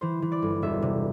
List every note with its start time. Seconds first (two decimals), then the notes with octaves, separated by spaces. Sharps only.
0.01 E3 C5
0.22 E3
0.32 D5
0.42 G1
0.62 E1 E5
0.82 C3